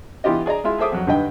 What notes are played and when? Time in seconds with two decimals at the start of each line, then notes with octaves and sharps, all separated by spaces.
0.24 E3 B3 E4 F4 G4 D#5
0.46 G#4 D5 D#5 A#5
0.64 G#3 E4 F4 E5
0.78 G#4 A4 C5 E5 D6 D#6
0.92 F2 F#3
1.07 G2 D3 D#4 B4 D#5 G5